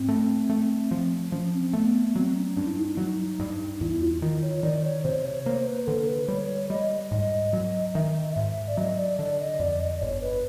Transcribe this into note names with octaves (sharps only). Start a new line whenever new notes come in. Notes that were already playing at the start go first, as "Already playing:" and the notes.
Already playing: G#2 C4
A3
A3
F3
F3 C#4
C4
A3 B3
B3
F#3 C4
C#4
G2 D4
E4
D#4
F#3
G2
E2 E4
F4
D#3
C#5
D#3 D5
C#5
C3 C5
C#5
A#3 C5
B4
D3 A4
B4
G3 C#5
G3 D#5
G#2 D#5
F#3
D#3 E5
G#2 E5
D5
F#3 D#5
D5
D3 D5
D#5
F2 D5
D#5
G1 C#5
B4